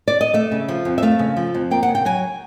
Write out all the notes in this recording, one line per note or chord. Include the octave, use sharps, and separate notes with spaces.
D5
D#5
A3 E5
C#3
F3
F2
E5
A3 F5
C#3
F3
F2
A#3 G5
F#5
C#3
G5
F#3 G#5